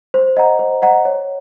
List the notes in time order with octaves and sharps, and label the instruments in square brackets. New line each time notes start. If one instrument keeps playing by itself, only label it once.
[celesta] C5
D#5 F#5 A#5
C5
D#5 F#5 A#5
C#5